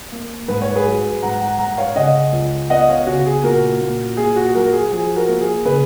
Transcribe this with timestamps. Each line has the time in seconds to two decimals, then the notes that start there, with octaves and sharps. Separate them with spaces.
0.12 A#3
0.48 G#2 B4
0.62 C#5
0.76 G#4 B4
0.86 F#3
1.22 G#2 F#5 A#5
1.41 F#5 A#5
1.59 G#2 F#5 A#5
1.77 C#5 F5
1.96 C#3 D#5 F#5
2.33 C#2
2.70 B3 D#5 F#5
2.88 C#5 F5
3.06 C#3 F#4
3.26 G#4
3.43 A#2 F#4 A#4
3.81 A#2
4.17 A#2 G#4
4.36 F#4
4.48 G#4
4.54 F#3 F#4 A#4
4.72 G#4
4.92 F3 G#4
5.16 F#4 A#4
5.28 A#3
5.41 G#4
5.65 C#3 G#4 B4